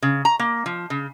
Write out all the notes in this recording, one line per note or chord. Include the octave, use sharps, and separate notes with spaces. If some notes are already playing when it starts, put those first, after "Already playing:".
C#3
A#5
A#3
F3
C#3